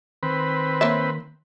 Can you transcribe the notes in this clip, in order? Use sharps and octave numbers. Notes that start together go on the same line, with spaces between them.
D#3 C4 B4
A#3 C#5 E5